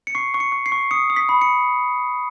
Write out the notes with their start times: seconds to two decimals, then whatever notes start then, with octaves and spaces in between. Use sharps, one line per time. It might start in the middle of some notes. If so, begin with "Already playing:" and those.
0.07 C#7
0.15 C#6 C7
0.34 C#6
0.40 C#7
0.52 C#6
0.66 C7
0.72 C#6
0.91 D#6 C#7
1.10 D#6
1.16 B6
1.29 B5
1.41 C#7